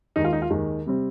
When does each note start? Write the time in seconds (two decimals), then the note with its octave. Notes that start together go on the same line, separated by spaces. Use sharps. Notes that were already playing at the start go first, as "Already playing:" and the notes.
0.16 D#2 D#3 G#3 D#4
0.25 F4
0.33 D#4
0.42 F4
0.50 D#2 D#3 G#3
0.86 C3 G3 C4